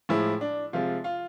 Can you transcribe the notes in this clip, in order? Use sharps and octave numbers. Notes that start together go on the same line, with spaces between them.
A2 F3 G#3 E4
D4
C3 F3 G#3 F4
F4